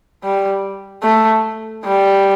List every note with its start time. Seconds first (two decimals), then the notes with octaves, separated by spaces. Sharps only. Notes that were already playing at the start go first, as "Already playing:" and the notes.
0.23 G3
1.03 A3
1.85 G3